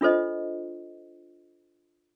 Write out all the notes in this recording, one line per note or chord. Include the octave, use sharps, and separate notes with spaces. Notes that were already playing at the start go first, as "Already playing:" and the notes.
D4 F4 A4 C5 D#5